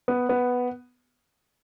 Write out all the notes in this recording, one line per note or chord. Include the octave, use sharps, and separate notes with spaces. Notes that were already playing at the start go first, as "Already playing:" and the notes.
B3
B3